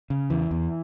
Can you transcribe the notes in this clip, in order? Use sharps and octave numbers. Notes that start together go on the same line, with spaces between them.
C#3
E2 E3
E2